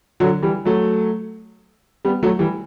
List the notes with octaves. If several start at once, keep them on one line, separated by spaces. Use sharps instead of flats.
D3 F#3
E3 G3
F#3 A3
G3 B3
F#3 A3
E3 G3